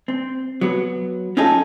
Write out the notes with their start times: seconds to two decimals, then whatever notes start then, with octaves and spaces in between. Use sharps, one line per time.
0.08 C4
0.61 F#3 B3
1.37 C#4 D#4 F4 G#4 A4